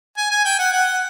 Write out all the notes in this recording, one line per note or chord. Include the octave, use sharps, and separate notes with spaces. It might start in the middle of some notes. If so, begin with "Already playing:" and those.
G#5
G#5
G5
F#5
F#5